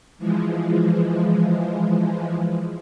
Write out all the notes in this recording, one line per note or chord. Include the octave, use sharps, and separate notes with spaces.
E3 F3 G#3